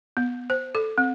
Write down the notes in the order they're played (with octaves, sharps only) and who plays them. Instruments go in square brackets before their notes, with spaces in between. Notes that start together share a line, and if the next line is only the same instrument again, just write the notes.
[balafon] B3
C5
A4
C4